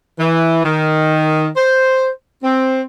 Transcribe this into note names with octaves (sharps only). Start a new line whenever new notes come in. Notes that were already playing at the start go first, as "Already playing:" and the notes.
E3
D#3
C5
C4